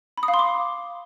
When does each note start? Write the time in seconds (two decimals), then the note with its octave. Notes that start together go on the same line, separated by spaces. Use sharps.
0.17 B5
0.23 D#6
0.28 F5
0.34 C6
0.39 D6